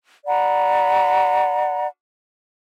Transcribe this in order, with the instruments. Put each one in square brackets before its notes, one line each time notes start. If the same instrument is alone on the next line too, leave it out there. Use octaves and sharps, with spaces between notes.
[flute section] D5 F#5 A#5 B5